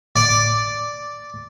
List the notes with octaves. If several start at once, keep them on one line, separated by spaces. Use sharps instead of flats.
D5